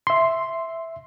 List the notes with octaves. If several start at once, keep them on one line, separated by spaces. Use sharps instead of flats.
E5 C6